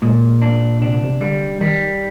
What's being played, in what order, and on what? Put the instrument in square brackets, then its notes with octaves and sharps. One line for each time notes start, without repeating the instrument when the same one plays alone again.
[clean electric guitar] A#2 [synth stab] G#3
[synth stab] A#3 [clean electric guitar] D4
[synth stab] C3 [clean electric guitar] D4
[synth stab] D3
C3
[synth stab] D3 [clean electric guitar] G3
[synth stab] D#3 [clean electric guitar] G3